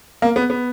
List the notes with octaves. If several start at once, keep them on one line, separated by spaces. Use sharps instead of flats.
A#3
B3
B3